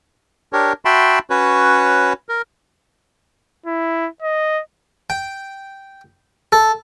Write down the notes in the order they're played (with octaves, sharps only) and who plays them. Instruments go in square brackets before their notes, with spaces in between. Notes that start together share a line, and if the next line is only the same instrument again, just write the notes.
[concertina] D4 G4 A#4 C#5
F#4 E5 G5 A5 B5 C6
C#4 F#4 B4 C#5
A#4
[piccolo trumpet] E4
D#5
[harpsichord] G5
A4